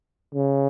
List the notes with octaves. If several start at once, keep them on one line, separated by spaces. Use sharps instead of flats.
C#3